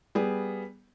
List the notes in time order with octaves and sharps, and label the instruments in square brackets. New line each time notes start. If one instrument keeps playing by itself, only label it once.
[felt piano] G3 B3 G#4